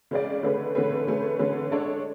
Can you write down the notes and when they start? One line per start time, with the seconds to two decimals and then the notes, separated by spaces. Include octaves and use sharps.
0.11 C#3 G#3 C#4 G#4 D5
0.43 D3 A3 C#4 G#4 B4
0.75 D3 A3 C#4 G#4 B4
1.07 D3 A3 C#4 G#4 B4
1.39 D3 A3 C#4 G#4 B4
1.71 G#3 D4 A4 C#5